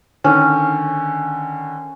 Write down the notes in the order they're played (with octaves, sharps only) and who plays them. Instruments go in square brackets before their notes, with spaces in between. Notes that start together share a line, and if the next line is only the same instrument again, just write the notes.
[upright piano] D3 D#3 [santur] C#4